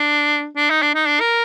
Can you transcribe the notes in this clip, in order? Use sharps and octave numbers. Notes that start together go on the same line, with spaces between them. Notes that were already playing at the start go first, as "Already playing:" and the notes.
Already playing: D4
D4
D#4
D4
D#4
D4
A#4